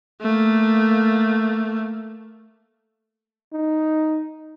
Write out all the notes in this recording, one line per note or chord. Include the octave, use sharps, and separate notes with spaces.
A3 A#3
D#4